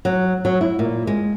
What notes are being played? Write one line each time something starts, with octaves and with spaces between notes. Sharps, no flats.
F#3
F#3
E4
A#2
G#3